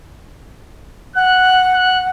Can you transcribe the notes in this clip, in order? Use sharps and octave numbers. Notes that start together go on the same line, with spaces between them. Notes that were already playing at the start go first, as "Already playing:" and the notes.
F#5 F#6
F#6